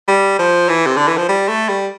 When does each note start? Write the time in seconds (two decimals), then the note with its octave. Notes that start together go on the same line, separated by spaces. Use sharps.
0.08 G3
0.39 F3
0.69 E3
0.86 C3
0.96 D3
1.08 E3
1.17 F3
1.29 G3
1.48 A3
1.69 G3